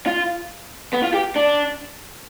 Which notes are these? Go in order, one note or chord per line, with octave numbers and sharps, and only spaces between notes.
F4
B3
F4
G4
D4